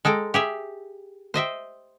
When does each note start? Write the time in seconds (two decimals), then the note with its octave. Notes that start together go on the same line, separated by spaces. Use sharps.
0.05 G#3 A4 G5 A#5
0.34 G4 G#4 E5
1.34 C5 D#5 E5 G5